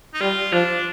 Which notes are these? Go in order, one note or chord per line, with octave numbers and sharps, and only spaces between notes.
D#4
G3 F4
F3 D4